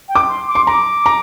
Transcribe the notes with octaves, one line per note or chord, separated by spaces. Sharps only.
G5
D6
C6
D6
C6
A#5 D6
A#5